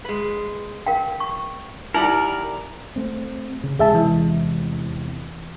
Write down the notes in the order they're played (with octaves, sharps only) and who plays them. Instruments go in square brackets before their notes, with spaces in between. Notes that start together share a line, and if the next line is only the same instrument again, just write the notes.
[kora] G#3 B4
[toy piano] A#4 F5 G5
C#6
[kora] G3 E5 F#5 [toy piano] D#4 E4 [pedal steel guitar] A#4 D5
[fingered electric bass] A3 C4
C#3
[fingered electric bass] E2 C3 G#3 [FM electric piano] G#4 E5 A5
[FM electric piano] E3